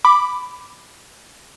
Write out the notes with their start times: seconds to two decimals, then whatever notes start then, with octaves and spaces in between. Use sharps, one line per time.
0.05 B5 D6